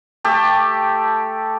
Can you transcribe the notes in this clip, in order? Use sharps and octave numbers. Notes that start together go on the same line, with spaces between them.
A3 G4 A4 A5